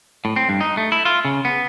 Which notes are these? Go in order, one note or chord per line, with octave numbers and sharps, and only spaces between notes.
A2
C4
G2
D#4
A3
E4
F4
C#3
B3